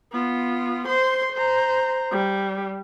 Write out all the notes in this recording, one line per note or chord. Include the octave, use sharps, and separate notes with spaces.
B3 F4
C5 C6
C5 A#5
G3